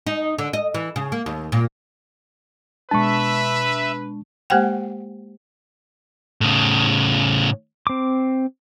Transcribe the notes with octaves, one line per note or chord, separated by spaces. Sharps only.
D#4
D3
D#5
E3
C#3
A#3
D#2
A#2
B2 G#3 D4 B4 E5 A5 C#6
G#3 A#3 G4 C5 F#5 G5
A2 C#3
C4 D6